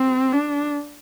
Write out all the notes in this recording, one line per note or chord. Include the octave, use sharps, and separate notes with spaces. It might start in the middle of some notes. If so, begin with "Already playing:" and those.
Already playing: C4
D4